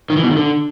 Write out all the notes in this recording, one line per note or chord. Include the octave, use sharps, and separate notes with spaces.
D#3
E3
B2
D#3
D3